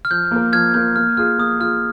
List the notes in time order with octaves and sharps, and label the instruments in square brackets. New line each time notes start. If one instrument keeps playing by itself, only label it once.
[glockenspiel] F6
[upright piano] F3 [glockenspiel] G6
[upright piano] A#3 F4 A#4
[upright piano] F3 [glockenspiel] F6 G#6
[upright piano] A#3 F4 A#4 [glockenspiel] G6
[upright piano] A#3 [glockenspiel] F6
[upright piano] F4 G#4 [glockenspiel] F6
[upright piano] A#3 [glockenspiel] D#6
[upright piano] F4 G#4 [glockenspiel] F6